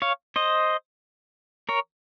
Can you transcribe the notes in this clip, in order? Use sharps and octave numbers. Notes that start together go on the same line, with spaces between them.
C#5 F5
C5 D#5
A#4 C#5